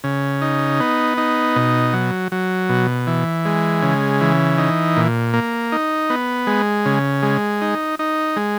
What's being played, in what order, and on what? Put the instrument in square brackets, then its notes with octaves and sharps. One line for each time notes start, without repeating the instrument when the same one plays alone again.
[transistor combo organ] C#3
D#4
B3
D#4
B2
F#3
F#3
B2
E3
G#3
C#3
E3
D#4
A#2
A#3
D#4
B3
G#3
C#3
G#3
D#4
D#4
G#3